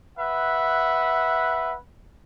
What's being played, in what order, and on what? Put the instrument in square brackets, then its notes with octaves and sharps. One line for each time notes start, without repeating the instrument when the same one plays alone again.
[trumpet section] B4 E5 F#5